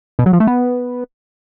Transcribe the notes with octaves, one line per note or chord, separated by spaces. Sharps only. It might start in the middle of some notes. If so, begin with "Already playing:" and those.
B2
F#3
F3
A3
B3